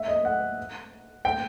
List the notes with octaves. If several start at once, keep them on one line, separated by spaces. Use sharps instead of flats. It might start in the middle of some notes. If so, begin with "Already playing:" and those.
Already playing: E5
D#5
F#5
G5